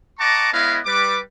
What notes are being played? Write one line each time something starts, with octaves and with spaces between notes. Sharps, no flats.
D#5 F#5 A5 A#5 C#6 D6
G#3 B3 E4 C#5 D#5 F5
G3 B4 D6